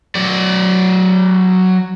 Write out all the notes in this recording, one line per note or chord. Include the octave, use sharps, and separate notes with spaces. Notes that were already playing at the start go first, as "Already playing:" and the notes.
F#3 D5